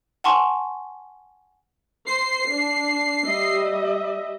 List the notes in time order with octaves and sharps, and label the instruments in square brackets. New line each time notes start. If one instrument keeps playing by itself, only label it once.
[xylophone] F#5 G#5 A5 C6 C#6
[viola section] C5 [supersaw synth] C7
[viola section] D4
G3 D#5 E5